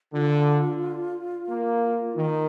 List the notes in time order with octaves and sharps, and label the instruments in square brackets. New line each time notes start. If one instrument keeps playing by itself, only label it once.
[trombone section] D3 [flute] F4
[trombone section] A#3
[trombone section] D#3 [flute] D#4